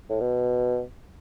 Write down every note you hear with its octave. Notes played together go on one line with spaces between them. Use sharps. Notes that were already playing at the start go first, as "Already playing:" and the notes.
A2
B2